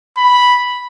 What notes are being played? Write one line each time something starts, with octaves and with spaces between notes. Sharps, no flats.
B5